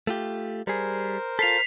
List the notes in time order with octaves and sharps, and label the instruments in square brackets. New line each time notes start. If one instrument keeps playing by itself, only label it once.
[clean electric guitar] A3 F4 G4
[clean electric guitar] G3 G#4 [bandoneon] A#4 C5
[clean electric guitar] F4 A4 [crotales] B6 C7 F7